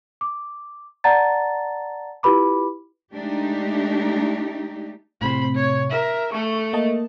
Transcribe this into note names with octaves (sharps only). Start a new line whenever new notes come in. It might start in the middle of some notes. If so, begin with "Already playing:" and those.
D6
D5 F#5 A5 A#5 A6
E4 F4 G4 B4 B5 D6
G#3 A3 D4 D#4 G4
A2 C3 C4 C5 B5
C#5
A#4 E5
A3 A4 C#6
A#3 D#5 A5